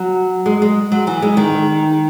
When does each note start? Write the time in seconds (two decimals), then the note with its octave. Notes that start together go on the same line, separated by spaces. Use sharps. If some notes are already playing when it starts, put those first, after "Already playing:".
Already playing: F#3
0.46 G#3
0.62 G#3
0.92 F#3
1.07 E3
1.22 G#3
1.37 D#3